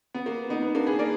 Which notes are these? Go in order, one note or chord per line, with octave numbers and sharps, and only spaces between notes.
B3
A#3
B3 D#4
B3
A#3 D4
G#4 B4
A#4 D5